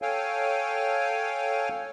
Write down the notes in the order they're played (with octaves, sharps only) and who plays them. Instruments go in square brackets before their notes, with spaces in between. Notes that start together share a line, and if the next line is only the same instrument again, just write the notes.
[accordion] A4 C#5 F5 G5 G#5